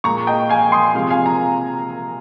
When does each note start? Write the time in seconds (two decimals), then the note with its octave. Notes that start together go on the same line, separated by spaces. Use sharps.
0.04 A#2 G#3 A#5 C#6
0.27 D#5 G5
0.49 F5 G#5
0.72 C6 D#6
0.95 C3 F3 G#3 F5
1.10 F5 G#5
1.26 A#5